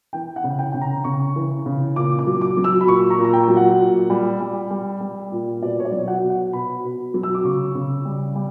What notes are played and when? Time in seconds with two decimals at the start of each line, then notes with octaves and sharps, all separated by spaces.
0.13 E3 G5
0.36 F#5
0.44 C#3
0.59 G5
0.72 C#3 G5
0.82 A#5
1.04 C#3 C#6
1.36 E3
1.66 C#3
1.96 A#2 D6
2.19 D6
2.27 F#3
2.41 D6
2.57 F#3
2.64 E6
2.81 B5
2.87 A#2 C#6
3.10 A#5
3.18 A#2
3.24 A#5
3.33 G5
3.48 F#3
3.57 F#5
3.79 A#2
4.10 G3
4.40 G3
4.70 G3
5.00 G3
5.32 A#2
5.62 B2 D5
5.80 C#5
5.85 D5
5.92 F#3
6.08 F#5
6.23 B2
6.30 F#5
6.53 B2 B5
6.84 B2
7.14 F#3
7.23 E6
7.34 D6
7.44 C#3 C#6
7.75 C#3
8.05 G3
8.35 G3